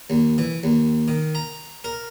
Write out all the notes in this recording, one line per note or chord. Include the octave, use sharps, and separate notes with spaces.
D#2
E3
D#2
D#3
A#5
A#4